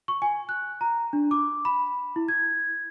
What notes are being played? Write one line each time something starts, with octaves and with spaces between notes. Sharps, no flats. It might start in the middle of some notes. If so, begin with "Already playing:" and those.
C#6
G#5
F#6
A#5
D4
D6
B5
E4
G#6